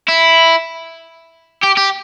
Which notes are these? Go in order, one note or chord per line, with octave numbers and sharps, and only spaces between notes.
E4
G4
G4